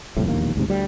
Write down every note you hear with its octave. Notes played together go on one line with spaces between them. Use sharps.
F#1 C2 F2 A2
E1 A#1 D#2 A#3
D2 G#2 C3
D2 G3